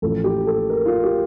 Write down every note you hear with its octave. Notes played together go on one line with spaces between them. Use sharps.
A1 A2 F3 A4
G4
A4
A#4
F4
G4